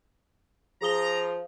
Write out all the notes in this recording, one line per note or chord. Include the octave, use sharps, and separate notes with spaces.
F3 G#4 A#5 D#6 G7